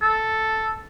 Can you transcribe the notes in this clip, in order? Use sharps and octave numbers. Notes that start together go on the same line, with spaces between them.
A4